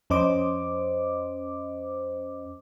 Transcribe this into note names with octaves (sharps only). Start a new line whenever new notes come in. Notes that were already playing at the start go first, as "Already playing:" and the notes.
F2 C#4 C5 D#5 D6